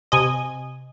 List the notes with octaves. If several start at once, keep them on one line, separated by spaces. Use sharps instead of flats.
C3 D#5 G#5